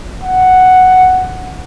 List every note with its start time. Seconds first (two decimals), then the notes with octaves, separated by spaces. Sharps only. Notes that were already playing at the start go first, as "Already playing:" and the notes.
0.23 F#5